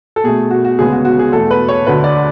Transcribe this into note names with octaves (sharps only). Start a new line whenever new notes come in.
A4
B2 A3 G#4
F#4
F#4
D2 C#3 G#3 B3 G#4
F#4
F#4
G#4
E2 B2 A3 A4
B4
C#5
D2 D3 A3 B4
D5